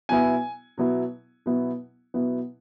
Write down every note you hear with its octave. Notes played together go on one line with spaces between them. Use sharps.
B2 F#3 B3 E4 G#5
B2 F#3 B3 E4
B2 F#3 B3 E4
B2 F#3 B3 E4